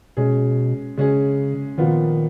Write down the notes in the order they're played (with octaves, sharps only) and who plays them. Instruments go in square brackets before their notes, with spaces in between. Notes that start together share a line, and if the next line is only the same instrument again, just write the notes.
[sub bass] B2 [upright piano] G#3 C#4 G#4
[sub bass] C#3 [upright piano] G#3 C#4 G#4
[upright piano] A#2 F3 B3 F4 [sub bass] D#3